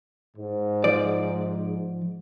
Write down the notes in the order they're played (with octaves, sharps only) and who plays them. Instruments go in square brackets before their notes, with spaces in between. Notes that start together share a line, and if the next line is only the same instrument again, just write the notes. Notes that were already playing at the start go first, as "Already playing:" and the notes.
[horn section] G#2
[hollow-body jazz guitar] F3 D5